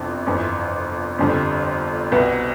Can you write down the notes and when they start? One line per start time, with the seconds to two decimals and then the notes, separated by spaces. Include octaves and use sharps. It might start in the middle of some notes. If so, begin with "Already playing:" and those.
Already playing: G1 F2 C3 E3
0.27 G1 F2 E3
1.18 G1 F2 D3 G3
2.12 C2 B2 B3